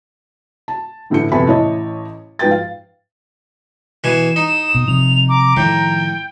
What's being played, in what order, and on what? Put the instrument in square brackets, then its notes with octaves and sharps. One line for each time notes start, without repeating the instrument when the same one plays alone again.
[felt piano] A5
A1 A2 D3 E3 A4 C#7
F2 C3 B3 A4 G#5 B5
A1 E4 C#5 D#5 A5
G#2 F3 B4 G5 A6
F5
[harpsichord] B2 E3 G#5 [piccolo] E7
[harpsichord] D#4 [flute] D#6 [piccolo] E7
[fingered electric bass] B2
[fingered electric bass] C3 F3 [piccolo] F7
[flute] A#5 [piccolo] D6
[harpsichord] A2 [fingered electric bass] D#3 F3 [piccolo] G5